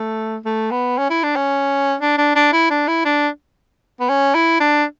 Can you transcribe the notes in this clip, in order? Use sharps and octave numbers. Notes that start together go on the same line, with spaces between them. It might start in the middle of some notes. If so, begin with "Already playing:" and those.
Already playing: A3
A3
B3
C#4
E4
D4
C#4
D4
D4
D4
E4
D4
E4
D4
B3
C#4
E4
D4